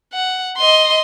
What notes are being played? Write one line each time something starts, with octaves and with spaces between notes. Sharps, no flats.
F#5
D#5 C6